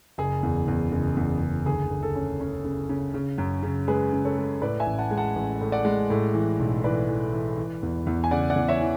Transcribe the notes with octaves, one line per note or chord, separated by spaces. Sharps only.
F#1 G#4
E2
E2
F#1
E2
F#1
D2 G#4
D2
A4
C#4
C#4
C#3
C#3
C#3
F#2
C#3
G#3 G#4 B4
C#3
A4 C#5
G#3
A2 B4 D5
E5 G#5
A1
F#5 A5
G#3
F#5 A5
A1
A2
D5 F#5
G#3
A2
E3
B1
E3 B4 D5
E3
E3
E3
E2
E2
G#5
C#3 D5 F#5
D5 F#5
E2
C#5 E5
E3